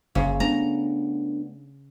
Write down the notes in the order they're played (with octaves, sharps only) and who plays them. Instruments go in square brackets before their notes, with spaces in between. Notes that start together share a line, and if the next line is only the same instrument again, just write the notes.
[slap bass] F#1 [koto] C#3
[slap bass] A3 B3 D4 [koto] A#5